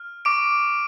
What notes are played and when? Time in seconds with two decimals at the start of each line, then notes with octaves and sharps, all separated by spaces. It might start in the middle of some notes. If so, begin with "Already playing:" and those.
Already playing: F6
0.25 C#6 D6 D7